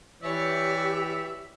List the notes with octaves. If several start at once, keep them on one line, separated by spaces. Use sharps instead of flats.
E3 G4 C#5 D5 E5